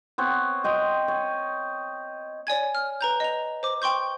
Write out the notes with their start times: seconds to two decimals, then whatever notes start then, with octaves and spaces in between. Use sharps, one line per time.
0.18 B3 C4 C#5
0.64 D#5 G5 C6
1.08 C#5
2.47 C#5 D5 G#5 G#6
2.75 F6
3.01 B4 A#5 G6
3.20 D#5 F7
3.63 C5 D6
3.82 G5 C6 C#6 G6